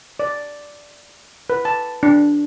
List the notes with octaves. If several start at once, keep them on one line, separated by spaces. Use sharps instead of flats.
D5
B4
A5
D4